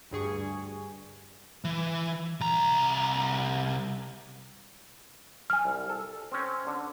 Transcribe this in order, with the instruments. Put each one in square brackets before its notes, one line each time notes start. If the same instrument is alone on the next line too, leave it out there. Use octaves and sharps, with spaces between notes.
[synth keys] D2 G2 G#4 C#6
[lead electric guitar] E3
C2 A#5
[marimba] G#5 F6
[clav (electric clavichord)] C2
A4
C4 C#4
D3